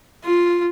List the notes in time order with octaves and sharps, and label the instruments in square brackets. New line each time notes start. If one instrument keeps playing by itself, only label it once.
[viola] F4